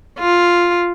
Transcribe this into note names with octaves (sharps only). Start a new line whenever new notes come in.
F4